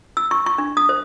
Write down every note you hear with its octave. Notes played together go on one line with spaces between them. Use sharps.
E6
C#6
C#6
D4
D#6
C5